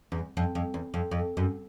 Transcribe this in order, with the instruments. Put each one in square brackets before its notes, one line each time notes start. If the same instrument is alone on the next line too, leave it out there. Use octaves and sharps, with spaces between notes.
[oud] E2
F2
F2
E2
F2
F2
F#2